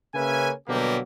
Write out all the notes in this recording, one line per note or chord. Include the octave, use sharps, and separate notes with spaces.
C#3 A#3 C#4 B4 E5 G#5
B2 D3 F#3 G3 A#3 G4